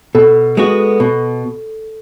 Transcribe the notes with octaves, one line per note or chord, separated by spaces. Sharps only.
B2 A4
G#3 B3 F#4
B2